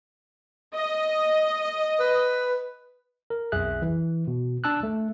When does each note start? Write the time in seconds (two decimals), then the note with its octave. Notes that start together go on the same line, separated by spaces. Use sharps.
0.75 D#5
2.00 B4
3.30 A#4
3.52 B1 F2 G#4 E5 F#6
3.82 E3
4.27 B2
4.64 D4 A5 E6 F#6
4.83 A3